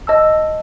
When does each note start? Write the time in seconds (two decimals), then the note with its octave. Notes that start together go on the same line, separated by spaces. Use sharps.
0.07 D#5 A5 E6